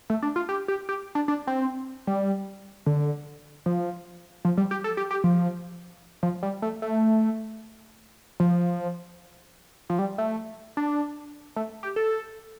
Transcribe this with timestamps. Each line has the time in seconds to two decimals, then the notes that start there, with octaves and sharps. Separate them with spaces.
0.10 A3
0.23 D4
0.36 F4
0.49 G4
0.68 G4
0.89 G4
1.15 D4
1.28 D4
1.47 C4
2.07 G3
2.86 D3
3.66 F3
4.45 F3
4.57 G3
4.71 G4
4.84 A4
4.97 G4
5.11 G4
5.24 F3
6.23 F3
6.43 G3
6.62 A3
6.82 A3
8.40 F3
9.89 F3
9.99 G3
10.18 A3
10.77 D4
11.56 A3
11.83 G4
11.96 A4